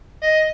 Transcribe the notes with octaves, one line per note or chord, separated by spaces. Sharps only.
D#5